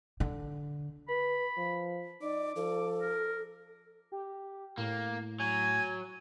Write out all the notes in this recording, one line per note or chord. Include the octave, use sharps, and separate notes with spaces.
D3
B4 B5
F3
D#4 D5 D6
F3 A4
A#4
G4
A2 A#3
F#3 G#5